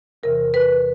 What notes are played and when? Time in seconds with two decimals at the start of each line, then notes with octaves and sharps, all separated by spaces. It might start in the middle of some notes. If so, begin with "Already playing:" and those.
0.23 E2 C3 E3 A#4
0.54 B4